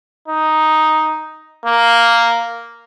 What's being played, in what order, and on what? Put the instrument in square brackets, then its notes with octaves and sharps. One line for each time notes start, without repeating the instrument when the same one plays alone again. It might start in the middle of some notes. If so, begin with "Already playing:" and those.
[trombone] D#4
A#3